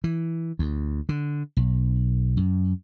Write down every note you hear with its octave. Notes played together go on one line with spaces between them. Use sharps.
E3
D2
D3
B1
F#2